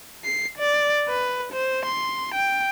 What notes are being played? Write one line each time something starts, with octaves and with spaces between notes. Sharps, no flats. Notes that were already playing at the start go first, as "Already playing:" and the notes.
C7
D5
B4
C5
C6
G5